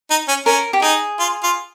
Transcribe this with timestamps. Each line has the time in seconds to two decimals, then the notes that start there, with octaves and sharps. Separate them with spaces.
0.10 D#4
0.28 C#4
0.46 C#4 A#4
0.73 G4
0.82 D#4 G#4
1.19 F4
1.43 F4